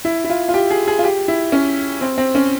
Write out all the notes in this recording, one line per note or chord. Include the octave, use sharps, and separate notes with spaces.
E4
E4
F4
F4
G4
G#4
G#4
F4
G4
E4
C#4
C4
C4
C#4